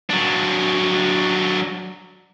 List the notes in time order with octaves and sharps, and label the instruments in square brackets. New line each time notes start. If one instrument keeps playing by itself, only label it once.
[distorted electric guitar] F#3 D4